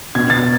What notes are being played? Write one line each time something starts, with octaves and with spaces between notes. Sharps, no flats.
B2 G#6
A6